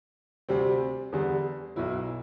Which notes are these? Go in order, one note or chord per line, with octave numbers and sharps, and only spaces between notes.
D2 C3 G3 C4
E2 D3 G3
B1 B2 F#3 E4